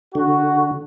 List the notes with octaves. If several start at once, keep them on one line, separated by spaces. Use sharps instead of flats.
D3 F#4